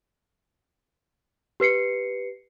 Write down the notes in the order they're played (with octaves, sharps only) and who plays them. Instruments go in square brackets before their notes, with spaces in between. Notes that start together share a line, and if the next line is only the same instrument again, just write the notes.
[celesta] G4 B4 C7 C#7